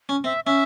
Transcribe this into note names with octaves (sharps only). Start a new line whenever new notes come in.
C#4
C4 E5
C#4 E5